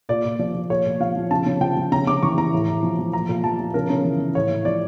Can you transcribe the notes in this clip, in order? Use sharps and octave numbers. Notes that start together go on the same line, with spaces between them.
A#2 D5
A#2
F3 D5
F3
A#2 C#5
A#2
F3 F5
F3
C#3 A5
C#3
F3 G5
F3
C#3 A#5
C#3 D6
E3 C#6
E3 A#5
A2
A2
F3
F3
A#2 A#5
A#2
F3 A5
F3
C#3 A#4
C#3
E3
E3
A2 C#5
A2
F3 D5